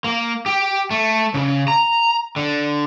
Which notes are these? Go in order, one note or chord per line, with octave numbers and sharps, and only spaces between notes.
A#3
G4
A3
C#3
A#5
D3